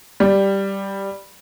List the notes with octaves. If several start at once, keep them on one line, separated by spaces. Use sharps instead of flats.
G3